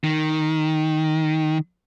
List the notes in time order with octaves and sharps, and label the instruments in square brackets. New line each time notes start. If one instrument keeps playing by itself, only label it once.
[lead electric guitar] D#3